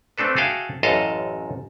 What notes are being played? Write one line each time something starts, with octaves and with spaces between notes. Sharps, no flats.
A3 C4 D4 A4 B4
F#4 G#4 A4 E5 F5 G5
A1 F#2 A4 D#5 F5